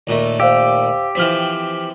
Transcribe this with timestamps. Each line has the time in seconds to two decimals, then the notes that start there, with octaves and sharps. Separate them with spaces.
0.07 D#2 A#2 A3
0.40 G4 C5 F5 E6
1.15 E3 F3 C4 F6 B6